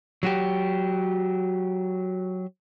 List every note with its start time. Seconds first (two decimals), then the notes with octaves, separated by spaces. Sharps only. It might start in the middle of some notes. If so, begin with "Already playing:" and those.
0.23 F#3 F#4 G4